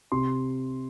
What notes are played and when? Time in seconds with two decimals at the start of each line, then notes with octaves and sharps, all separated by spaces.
0.12 C3 C6